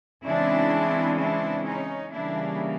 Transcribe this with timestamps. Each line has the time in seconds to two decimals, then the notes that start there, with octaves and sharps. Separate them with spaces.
0.25 C#3 E3 G#3 C4 D4 E4
1.18 D4 E4
1.65 C#4 D#4
2.12 C#3 E3 G3 A#3 D4 E4